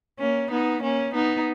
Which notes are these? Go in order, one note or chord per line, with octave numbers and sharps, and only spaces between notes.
A#3 C#4
B3 D#4
A#3 C#4
B3 D#4